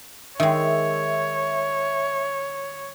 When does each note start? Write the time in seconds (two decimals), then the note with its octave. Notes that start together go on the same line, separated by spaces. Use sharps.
0.40 D#3 G#3 C#5 E5